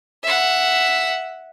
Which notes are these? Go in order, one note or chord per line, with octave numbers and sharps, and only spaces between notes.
E5 F#5